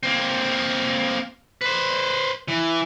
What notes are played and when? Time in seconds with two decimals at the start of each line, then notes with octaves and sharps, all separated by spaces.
0.03 A#3 C4
1.61 B4 C5
2.48 E3